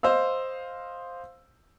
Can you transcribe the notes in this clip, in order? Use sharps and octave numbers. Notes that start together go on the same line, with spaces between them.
C5 D#5 F5 E6